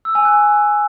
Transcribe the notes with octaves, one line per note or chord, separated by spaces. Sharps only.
E6
G#5
F#6